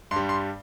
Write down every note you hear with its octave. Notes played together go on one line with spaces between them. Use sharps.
G2 C6
G3
C6